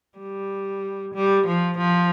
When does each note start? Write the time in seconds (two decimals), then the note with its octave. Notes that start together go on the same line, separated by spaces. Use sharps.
0.19 G3
1.15 G3
1.47 F3
1.78 F3